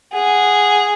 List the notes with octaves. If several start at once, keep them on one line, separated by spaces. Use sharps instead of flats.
G#4 F#5